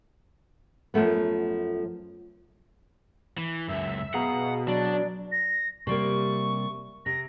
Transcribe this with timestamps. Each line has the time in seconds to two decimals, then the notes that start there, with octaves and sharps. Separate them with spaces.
0.94 F#2 F3 F#3 A3 B3
3.38 E3
3.68 C#2 F#2 E5
4.14 B2 G#4 F5 F#5 A#5
4.68 F#3 D4 D5
5.32 A#6
5.87 C3 G3 A#3 C#6
7.06 C3 A#6